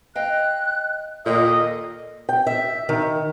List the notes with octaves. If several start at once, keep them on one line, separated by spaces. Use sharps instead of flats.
D#5 F5 G5 F#6
D#2 A#2 A4 D#5
G5
E5
D#3